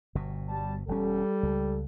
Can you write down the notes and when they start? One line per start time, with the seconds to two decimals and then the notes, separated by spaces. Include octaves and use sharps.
0.15 G1 B2
0.48 G3 A5
0.88 E1 G3 C#4 A4
1.43 C#2